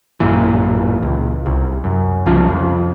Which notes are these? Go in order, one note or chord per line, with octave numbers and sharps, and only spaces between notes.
A1 F#2 A#2 E3
C#2
C2
F#2
C2 C#3 F3
F2